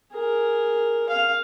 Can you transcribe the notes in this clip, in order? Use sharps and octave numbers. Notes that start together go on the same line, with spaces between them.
G#4 A#4
F5